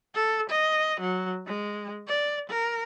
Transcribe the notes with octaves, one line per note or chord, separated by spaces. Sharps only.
A4
D#5
F#3
G#3
D5
A#4